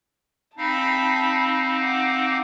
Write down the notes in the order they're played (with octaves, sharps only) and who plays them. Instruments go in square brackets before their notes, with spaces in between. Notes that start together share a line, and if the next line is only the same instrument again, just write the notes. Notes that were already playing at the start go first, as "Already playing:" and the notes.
[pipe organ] C4 D#4 F5 [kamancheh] A5 B5
[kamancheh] F#5 D6